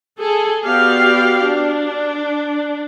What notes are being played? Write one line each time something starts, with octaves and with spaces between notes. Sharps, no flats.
G#4 A4 G#5
B3 F#4 G4 D5 F5
D4